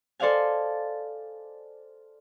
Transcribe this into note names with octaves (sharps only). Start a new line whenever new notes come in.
A4 C5 D5 D#5 F5 G#5